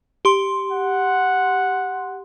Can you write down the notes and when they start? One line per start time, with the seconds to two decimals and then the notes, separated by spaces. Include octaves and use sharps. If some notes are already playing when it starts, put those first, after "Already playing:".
0.25 G4 C6
0.71 F#5